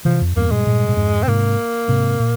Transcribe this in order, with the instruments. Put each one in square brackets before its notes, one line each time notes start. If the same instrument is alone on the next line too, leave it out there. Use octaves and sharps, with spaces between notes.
[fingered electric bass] C3 E3 [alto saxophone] F3
[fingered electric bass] F2
[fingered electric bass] E2 G2 [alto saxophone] A#3
[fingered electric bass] G2 A#2 [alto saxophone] G#3
[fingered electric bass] G2 A#2
A#2
F2 G#2
[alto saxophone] C4
[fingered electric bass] G#2 C3 [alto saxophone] A#3
[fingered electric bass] G#2 C3
A#2